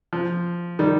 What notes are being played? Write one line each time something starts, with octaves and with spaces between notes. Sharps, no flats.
F3
D#3 G3